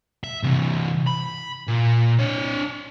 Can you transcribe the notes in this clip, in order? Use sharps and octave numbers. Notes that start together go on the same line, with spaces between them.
E5
C3 E3
B5
A#2
D4 C#5